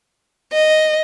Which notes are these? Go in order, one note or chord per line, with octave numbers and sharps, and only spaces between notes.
D#5